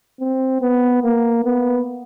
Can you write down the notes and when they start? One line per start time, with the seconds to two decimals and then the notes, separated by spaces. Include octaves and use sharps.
0.20 C4
0.61 B3
1.03 A#3
1.45 B3